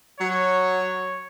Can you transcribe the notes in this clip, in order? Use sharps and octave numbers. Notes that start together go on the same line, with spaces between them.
F#3 C#5